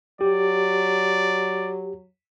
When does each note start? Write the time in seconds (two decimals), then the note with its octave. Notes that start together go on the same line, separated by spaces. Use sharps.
0.21 F#3 G4 D5